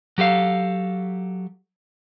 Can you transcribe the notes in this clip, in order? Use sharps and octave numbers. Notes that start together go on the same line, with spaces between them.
F#3 G4 A4 F5